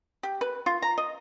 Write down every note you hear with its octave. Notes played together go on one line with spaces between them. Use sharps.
G4
B4
F4
A#5
D#5